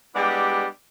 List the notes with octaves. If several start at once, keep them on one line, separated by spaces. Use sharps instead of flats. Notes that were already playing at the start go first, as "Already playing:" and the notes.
G3 G#3 B3 D4 E4 G4